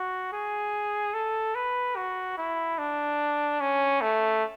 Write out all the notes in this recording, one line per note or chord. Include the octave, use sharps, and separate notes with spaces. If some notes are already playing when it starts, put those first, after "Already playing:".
Already playing: F#4
G#4
A4
B4
F#4
E4
D4
C#4
A3